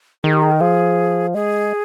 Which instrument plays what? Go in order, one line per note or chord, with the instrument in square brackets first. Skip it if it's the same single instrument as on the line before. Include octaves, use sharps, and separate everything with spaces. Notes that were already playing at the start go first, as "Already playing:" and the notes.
[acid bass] D#3 [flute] G#4
[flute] G4
G#4
A#4
[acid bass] F3 [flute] G#4
[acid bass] G#3 [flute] G#4